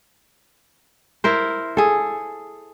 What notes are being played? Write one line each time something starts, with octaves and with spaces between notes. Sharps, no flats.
E4 A#4 C5
G#4 A4